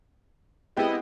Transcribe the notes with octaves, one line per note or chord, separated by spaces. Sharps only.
G#3 B3 C4 E4 G4 D#5